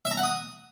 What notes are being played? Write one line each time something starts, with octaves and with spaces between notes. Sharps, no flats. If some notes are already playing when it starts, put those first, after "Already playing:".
E5
A#5
F#5
D#6